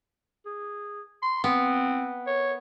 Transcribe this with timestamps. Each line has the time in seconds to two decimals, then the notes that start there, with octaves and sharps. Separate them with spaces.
0.46 G#4
1.23 C6
1.44 B3 C4
2.27 C#5